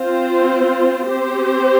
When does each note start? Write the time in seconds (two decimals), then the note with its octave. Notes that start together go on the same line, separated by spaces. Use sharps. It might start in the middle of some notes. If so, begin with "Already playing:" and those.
Already playing: C4 F4 C5
1.08 C4 G4 C5